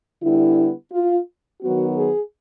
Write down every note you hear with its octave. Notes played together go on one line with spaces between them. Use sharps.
D3 G3 B3 E4
F4
D#3 F#3 B3 F#4
G#4